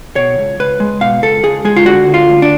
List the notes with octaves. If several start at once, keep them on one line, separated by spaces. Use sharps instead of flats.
B2 C#5
C#2
C#2 B4
G#3
B2 F5
C#2 A4
C#2 G#4
G#3 G#4
F4
D3 F#4
D2
F4
D2
D4